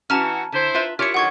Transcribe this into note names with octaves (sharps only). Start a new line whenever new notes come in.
E3 C#4 F#4 A5 A#5 F6
D3 E4 C5
F4 B4 E5
E4 F4 G4 A#4 C#5 F6 C#7
D3 D#3 F#3 F#5 C#6 G#6